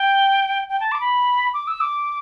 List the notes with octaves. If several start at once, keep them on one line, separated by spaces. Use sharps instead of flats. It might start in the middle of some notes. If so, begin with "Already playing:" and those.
Already playing: G5
G5
A5
D6
B5
D6
E6
D6